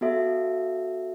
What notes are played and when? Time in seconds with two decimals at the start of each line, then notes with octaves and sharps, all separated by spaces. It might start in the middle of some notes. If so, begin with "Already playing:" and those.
0.01 B3 F#4 A4 E5